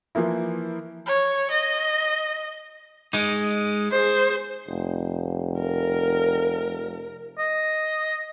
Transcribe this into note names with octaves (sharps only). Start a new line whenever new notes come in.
E3 F3 A#3 E4
C#5
D#5
G#3 D#4
G#4 C5
F1
A#4
D#5